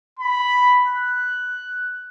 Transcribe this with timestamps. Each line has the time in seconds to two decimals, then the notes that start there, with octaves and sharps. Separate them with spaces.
0.20 B5
0.87 F#6